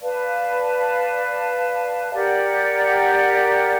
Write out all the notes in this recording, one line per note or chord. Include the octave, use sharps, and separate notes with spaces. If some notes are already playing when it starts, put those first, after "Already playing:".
B4 D5 F5 A5
G4 A#4 D5 F#5